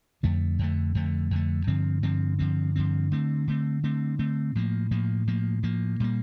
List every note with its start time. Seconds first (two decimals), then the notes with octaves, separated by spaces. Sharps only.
0.23 F2 D3 A3
0.59 F2 D3 A3
0.95 F2 D3 A3
1.31 F2 D3 A3
1.67 G2 D3 F3 C4
2.03 G2 D3 F3 C4
2.39 G2 D3 F3 C4
2.76 G2 D3 F3 C4
3.11 D3 A3 C4
3.47 D3 A3 C4
3.83 D3 A3 C4
4.19 D3 A3 C4
4.55 A2 F3 A#3
4.91 A2 F3 A#3
5.27 A2 F3 A#3
5.63 A2 F3 A#3
6.00 A#2 G3 A#3